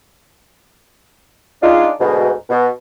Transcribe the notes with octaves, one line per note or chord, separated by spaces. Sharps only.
G#3 D4 D#4 F4
D2 G#2 B2
B2